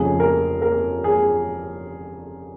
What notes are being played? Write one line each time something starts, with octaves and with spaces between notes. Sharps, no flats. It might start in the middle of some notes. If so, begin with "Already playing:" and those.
Already playing: F1 F2 C#3 G#4
A#4
A#4
G#4